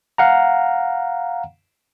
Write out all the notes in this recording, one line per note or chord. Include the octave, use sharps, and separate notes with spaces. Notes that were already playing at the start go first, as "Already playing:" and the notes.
F5 F#5 A#5